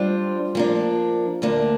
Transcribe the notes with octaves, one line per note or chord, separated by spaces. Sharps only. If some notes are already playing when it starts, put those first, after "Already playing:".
Already playing: G3 D4 F4 C5
F3 A#3 D4
D2 D3 A#3 D4